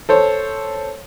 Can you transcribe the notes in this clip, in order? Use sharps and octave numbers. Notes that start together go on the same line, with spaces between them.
A4 C5 C#5